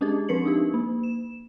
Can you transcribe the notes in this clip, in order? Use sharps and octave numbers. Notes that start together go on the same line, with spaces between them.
G#3 C#4 D4 G4 G#4
F3 C4 A#4 B4 C#7 F#7
D4 D#4 G4
A#3
E7